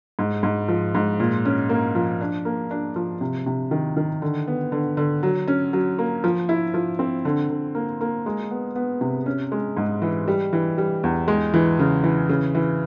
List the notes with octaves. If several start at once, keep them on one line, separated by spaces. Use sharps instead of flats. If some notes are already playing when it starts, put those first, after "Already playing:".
G#2
G#2
F3
G#2
A#2
C#4
A#3
F3
D4
A#3
D4
F3
C3
C3
D#3
D#3
D3
B3
D3
D3
F#3
C#4
F#3
A#3
F3
E4
F3
C4
D3
D3
A#3
A#3
G#3
B3
B3
C3
C#4
G#3
G#2
E3
G3
E3
G3
E2
G#3
E3
C#3
E3
C#3
E3